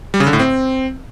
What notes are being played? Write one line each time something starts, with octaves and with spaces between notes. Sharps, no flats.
G3
C#3
D3
A2
C4